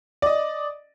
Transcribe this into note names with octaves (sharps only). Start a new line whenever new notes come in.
D5 D#5